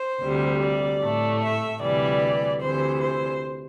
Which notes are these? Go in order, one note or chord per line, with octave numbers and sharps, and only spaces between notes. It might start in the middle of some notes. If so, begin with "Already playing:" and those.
Already playing: C5
D2 C3 G3
D5
A2 A3
E5
D2 C3 E3 G3 D5
D2 C3 E3 C5
C5